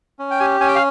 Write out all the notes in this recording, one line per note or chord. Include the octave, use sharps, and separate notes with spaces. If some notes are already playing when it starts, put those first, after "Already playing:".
C#4
G5
G4 G#5
C#4 G#5
G5
F5